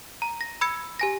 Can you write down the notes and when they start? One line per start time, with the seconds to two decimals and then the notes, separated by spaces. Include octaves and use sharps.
0.22 A#5
0.41 A#6
0.61 B5 E6 G#6 C#7
0.99 G4 G#5 A#6